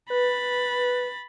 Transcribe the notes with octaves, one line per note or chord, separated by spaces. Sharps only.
B4 B5 A6